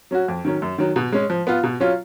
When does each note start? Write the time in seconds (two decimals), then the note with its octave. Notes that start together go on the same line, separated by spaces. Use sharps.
0.11 F#3 C#4 F#4
0.28 F2
0.45 D#3 F#3 C#4
0.62 F#2
0.78 D#3 F#3
0.96 B2
1.12 G#3 C#4
1.30 F3
1.47 B3 F4
1.64 B2
1.80 F#3 C#4 F4